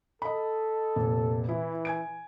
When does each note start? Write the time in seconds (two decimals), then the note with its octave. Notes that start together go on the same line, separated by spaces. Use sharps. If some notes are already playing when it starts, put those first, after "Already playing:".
0.22 A4 D#5 B5
0.96 F1 A#2
1.49 E3 E4
1.85 G#5 G#6 D7